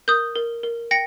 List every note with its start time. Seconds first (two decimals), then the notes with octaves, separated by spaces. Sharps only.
0.08 A#4 D#6 G6
0.35 A#4
0.63 A#4
0.91 G5 A#6 C#7